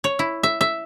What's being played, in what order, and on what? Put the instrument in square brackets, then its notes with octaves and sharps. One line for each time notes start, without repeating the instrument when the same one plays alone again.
[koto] C#5
E4
E5
E5